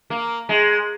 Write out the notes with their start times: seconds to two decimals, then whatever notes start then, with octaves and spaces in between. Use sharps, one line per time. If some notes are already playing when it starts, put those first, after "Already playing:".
0.10 A#3
0.49 G#3